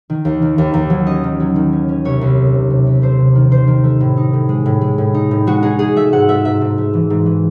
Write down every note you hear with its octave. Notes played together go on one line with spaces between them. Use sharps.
D#3
D#2
D#3
D#2
D#2
F#3
C#4 D#5
D#3
F#3
D#3
C#4
C#4
C2 C#5
C2
A3
C3
C3
C2
A3 C5
C3
D#3
D#3 C5
D#3
A3
A2
D#4
A2
G#3
A2
G#3
A2
D#4
A2
G#3 F#4
D#4 G#4
D#4 G#4
A3 E5
G#2 F#5
A3 E5
G#2 E5
G#2
A3
E3
G#2
E3